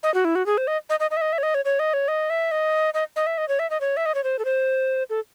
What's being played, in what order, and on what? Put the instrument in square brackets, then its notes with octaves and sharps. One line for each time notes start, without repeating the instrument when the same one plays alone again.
[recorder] D#5
F#4
E4
F#4
G#4
C5
D#5
D#5
D#5
D#5
E5
D#5
E5
C#5
D#5
C#5
C#5
D#5
C#5
D#5
E5
D#5
D#5
D#5
E5
D#5
C#5
E5
D#5
C#5
E5
D#5
C#5
C5
A4
C5
A4